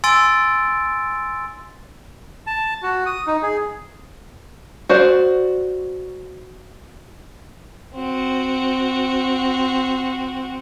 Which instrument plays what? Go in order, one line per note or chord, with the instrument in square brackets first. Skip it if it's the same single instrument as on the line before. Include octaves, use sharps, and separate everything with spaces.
[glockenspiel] G#5 C6 E6 A6 D7
[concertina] A5
F#4
D#6
D#4
G#4
[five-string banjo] F#4 C5 D5
[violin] C4 F#4